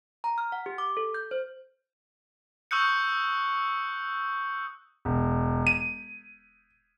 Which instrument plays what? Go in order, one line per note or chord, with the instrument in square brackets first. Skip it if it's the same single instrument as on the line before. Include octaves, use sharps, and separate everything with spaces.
[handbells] A#5
F6
F#5
G4
D6
A4
G6
C5
[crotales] C#6 D#6 E6 F#6 G6 C#7
[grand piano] E1
D#7